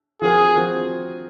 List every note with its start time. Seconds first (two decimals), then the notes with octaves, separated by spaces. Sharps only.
0.22 F3 C4 F#4 G#4 A#4
0.55 F3 C4 F#4 A#4